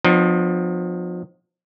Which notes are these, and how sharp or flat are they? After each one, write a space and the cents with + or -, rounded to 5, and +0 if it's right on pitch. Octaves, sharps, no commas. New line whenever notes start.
F3 +30 B3 +40 D#4 -40